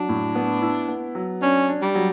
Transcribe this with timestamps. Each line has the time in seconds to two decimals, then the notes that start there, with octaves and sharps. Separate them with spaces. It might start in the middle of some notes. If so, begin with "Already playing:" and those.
Already playing: F#3 D4
0.09 A2
0.35 B3
0.62 E4
0.88 B3
1.15 F#3
1.41 C#4 D4
1.69 D4
1.82 G3
1.95 F#3